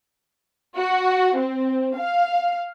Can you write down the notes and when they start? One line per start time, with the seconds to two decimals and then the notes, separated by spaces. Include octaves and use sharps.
0.78 F#4
1.37 C4
1.97 F5